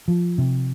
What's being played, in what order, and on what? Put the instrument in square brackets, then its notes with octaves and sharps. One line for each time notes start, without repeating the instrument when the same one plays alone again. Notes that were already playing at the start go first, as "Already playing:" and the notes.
[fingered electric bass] F3
C3